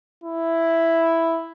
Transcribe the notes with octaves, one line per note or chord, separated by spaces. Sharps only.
E4